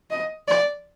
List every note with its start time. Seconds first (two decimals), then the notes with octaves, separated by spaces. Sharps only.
0.10 D#5
0.48 D5